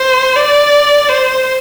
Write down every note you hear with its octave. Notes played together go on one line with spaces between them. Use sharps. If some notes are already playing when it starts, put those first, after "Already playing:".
Already playing: C5
D5
C5